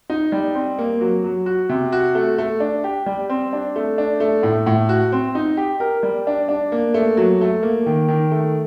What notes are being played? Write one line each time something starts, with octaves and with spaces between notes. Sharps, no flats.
D#4
G3
C4
A#3
F#3
F#3
F#4
C3
F#4
A3
A3
D4
G4
G3
C4
D4
A3
D4
A3
A2
A2
F#4
C4
D#4
G4
A#4
G3
D4
D4
A#3
A3
F#3
A3
A#3
D#3
D#3
A3